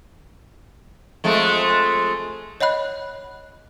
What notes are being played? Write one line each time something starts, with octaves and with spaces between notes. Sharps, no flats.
F2 G#3 A3
C#5 D#5 F#5 B5 F#6